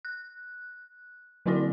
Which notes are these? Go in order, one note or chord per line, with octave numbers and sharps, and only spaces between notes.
F#6
D3 F#3 C4 E4 F#4 D5